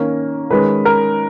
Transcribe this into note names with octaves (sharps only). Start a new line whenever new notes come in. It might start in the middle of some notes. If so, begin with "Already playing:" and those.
Already playing: D#3 A#3 C#4
D#3 G#3 C#4 B4
A#4